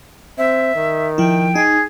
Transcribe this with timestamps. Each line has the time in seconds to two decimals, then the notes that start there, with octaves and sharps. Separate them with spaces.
0.38 C4 E5
0.75 D#3
1.18 F3 E4 G5
1.55 D#4 G#4